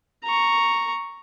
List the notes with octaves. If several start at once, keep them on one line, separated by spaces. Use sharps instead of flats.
A#5 C#6